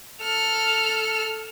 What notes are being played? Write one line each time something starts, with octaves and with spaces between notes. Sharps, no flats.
A4 F6